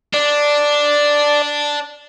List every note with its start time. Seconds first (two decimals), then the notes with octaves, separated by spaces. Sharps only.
0.14 D4 D5